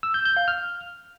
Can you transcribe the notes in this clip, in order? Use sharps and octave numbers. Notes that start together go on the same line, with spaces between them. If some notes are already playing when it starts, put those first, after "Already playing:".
E6
G6
G6
F5
F6